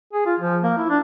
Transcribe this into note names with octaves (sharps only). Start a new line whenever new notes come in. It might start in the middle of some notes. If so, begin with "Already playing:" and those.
G#4
F4
F3
A#3
E4
D4